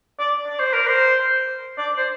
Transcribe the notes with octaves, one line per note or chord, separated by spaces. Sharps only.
D5
D5
C5
A#4
C5
D5
C5